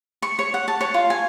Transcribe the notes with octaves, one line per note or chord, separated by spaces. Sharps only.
C#6
C#5
F#5
A5
C#5
F4
G#5